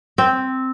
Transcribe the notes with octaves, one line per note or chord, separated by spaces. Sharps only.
C4